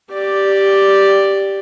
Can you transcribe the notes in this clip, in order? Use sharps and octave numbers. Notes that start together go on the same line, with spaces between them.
G4 D5